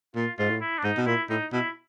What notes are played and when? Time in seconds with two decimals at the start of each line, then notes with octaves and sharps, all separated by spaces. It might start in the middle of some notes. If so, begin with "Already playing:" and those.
0.15 A#2 F4
0.38 G#2 F4
0.50 A2
0.61 E4
0.78 D4
0.84 G#2 D#4
0.97 B2
1.06 A#2 E4
1.30 A2 D#4
1.52 B2 E4